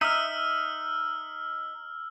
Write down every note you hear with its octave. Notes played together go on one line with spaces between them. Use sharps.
D#4 E5 E6 F6